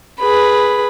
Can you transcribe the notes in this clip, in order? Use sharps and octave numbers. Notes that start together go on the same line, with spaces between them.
G#4 B4 B5